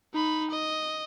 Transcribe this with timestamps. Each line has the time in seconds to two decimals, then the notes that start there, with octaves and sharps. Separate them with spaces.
0.14 D#4 B5
0.51 D#5